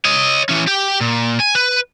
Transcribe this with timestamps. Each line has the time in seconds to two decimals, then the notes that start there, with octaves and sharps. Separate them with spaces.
0.05 C#5 D#5
0.49 E3 C#4
0.67 G4 G5
1.01 A#2
1.40 G#5
1.55 B4